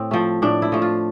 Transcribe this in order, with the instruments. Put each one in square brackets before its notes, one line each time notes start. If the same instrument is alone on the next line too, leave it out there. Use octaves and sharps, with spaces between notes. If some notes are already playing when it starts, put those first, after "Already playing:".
Already playing: [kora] A2 C4
F3 A3
A2 D4
E4
F3 A3
F4